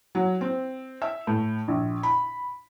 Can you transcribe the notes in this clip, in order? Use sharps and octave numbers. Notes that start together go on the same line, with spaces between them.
F#3
C4
E5
A2
A#1
B5